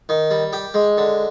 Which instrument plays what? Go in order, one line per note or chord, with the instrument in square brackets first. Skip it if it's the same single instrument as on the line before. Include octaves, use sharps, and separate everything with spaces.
[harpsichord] D#3
G3
G4
G#3
D3